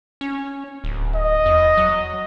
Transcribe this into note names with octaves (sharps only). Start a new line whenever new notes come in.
C#4
D1
D#5
E2
F#3